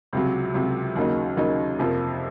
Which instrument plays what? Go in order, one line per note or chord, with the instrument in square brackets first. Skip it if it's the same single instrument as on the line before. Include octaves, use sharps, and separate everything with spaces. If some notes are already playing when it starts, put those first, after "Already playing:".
[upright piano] C#2 C3 F#3
C#2 C3 F#3
D#2 C#3 F#3 A#3 D#4
D#2 C#3 F#3 A#3 D#4
F2 C3 F3 A#3